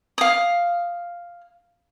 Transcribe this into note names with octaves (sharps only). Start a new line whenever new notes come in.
F5 D#6